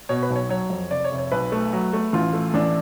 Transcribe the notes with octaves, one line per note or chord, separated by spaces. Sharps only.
B2 C#5
B4
B1
C#5
F#3 C#5
F2
F1 D5
C#5
F1
C#5
B1 B4
A3
F#3
A3
A1 F4
A3
A1 D4